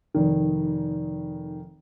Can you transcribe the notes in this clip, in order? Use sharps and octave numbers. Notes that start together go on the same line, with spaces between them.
F1 D#3